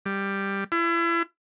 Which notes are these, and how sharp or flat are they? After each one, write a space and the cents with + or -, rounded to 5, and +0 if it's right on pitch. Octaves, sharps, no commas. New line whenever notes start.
G3 +5
E4 +35